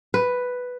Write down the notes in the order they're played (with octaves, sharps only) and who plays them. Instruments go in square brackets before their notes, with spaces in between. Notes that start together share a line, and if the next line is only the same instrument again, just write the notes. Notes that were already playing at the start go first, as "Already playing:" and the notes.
[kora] B4